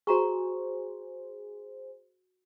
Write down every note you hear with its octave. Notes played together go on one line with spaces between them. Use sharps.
F#4 G#4 C5 A#5 C#6